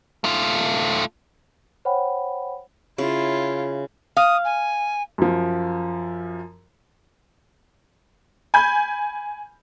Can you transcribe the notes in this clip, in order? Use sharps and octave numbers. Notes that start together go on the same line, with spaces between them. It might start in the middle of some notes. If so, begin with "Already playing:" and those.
A3 F4
C5 C#5 F#5 G5 B5
C#3 E4 F4
F5 D#6
G#5
F#2 F3
G#5 B5 G6